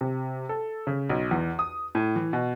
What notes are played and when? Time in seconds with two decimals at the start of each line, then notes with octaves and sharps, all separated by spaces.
0.01 C3
0.49 A4
0.87 C#3
1.09 B1
1.31 E2
1.59 D#6
1.95 A2
2.16 E3
2.33 B2